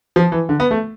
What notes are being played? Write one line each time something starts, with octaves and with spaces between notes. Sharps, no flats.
F3
E3
D3
B3
A3